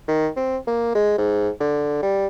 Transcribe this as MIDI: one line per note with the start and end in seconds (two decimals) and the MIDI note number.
0.08 0.29 51
0.37 0.58 60
0.67 0.92 58
0.95 1.15 56
1.18 1.50 44
1.60 2.02 50
2.02 2.28 55